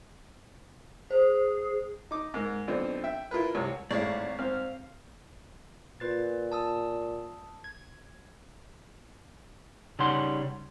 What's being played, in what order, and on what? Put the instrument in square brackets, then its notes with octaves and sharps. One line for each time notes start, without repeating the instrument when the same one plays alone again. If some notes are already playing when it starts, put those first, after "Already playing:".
[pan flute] G#4 [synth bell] C5
[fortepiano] D#4 D6
G#2 A#3
B1 C4 D4 F4
E5 G5
E4 F4 A#4 B4
C2 C3 C#5
[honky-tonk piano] G#1 C#6 [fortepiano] A2 G#3 [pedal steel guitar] D5 F5
[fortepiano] C4 [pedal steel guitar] F5 F6
[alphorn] A#2 [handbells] F4 B4 A6
[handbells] A5 D#6 E6
G#6
[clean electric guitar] C#3 G3 D#4 C#5 F#5 C6